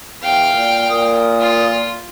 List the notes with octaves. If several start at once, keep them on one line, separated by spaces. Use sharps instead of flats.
E2 F5 G5
A#2
A#2 A#4 D#6
F4